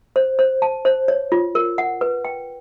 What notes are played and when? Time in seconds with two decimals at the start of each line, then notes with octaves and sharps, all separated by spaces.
0.16 C5
0.39 C5
0.62 A5
0.85 C5
1.08 C#5
1.32 F4
1.55 A#4
1.78 F#5
2.01 B4
2.25 G5